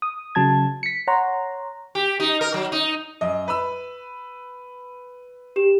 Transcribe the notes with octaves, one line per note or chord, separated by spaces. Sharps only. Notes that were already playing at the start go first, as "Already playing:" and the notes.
D#6
C#3 F#3 A5 G#6
B6 C#7
C#5 F#5 A#5 C6
G4
D#4
A#4
F#3
D#4
F#2 D#5
B4 B5 E6
G4 E7